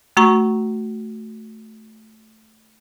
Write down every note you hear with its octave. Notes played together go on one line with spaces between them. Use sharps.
A3 F#4 A#5 C#6